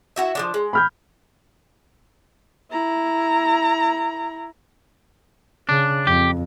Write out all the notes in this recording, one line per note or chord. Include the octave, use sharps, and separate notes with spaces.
E4 F#4 E5
F3 G#3 D4
G#3
B5 F6 G6
E4 A#5
C#3 D4
F2 G4